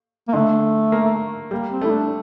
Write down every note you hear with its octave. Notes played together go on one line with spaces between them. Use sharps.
A#3
D3 A3
A#3
G3 A#3
C4
A3 E4
D4